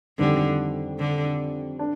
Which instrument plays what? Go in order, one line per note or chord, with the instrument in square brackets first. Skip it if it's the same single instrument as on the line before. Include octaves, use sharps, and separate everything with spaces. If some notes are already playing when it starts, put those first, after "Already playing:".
[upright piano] F2 D#3 G3 [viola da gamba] D3
[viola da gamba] D3
[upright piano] D4